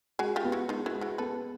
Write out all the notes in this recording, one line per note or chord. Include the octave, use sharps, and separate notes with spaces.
G#3 F#4 G#4
F4 G4
B3
E4 F#4
G#3 D#4 F4
E4 F#4
G#3
E4 F#4
B3 A4 B4